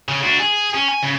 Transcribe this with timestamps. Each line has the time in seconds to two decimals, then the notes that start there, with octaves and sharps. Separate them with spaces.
0.09 C#3
0.23 D4 F#4
0.39 G#4
0.75 C#4
0.88 G#5
1.03 C#3